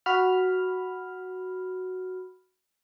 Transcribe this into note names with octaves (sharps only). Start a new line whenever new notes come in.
F#4 B5 F6